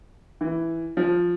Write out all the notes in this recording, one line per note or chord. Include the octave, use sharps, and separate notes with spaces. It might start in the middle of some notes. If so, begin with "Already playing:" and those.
E3
F3